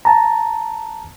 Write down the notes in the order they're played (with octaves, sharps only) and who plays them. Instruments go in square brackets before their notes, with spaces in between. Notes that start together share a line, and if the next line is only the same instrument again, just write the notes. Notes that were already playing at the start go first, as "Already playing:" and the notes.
[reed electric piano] A5 A#5